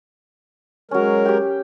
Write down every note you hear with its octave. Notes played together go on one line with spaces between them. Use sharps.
F#3 G#3 C#4 A#4
G4 G5